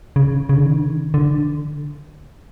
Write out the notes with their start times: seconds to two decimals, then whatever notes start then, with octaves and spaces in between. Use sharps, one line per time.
0.16 C#3
0.49 C#3
0.57 D3
0.65 D#3
1.14 D3